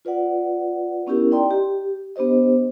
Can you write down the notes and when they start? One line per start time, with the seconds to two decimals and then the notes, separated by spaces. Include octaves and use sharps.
0.05 F4 B4 D5 F#5
1.07 B3 C#4 E4 G4 A#4
1.31 D#4 D5 D#5 G5 A#5 C6
1.51 G4
2.16 B3 D4 G4 C5 D#5